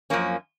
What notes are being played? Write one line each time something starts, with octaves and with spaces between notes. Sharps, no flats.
F#2 F3 A#3 C#4